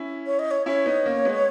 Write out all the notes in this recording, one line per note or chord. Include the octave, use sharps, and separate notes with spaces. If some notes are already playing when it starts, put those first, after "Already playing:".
Already playing: C#4 E4
C#5
D#5
C#5
C#4 E4 C#5
B3 D#4
A#3 C#4
G#3 B3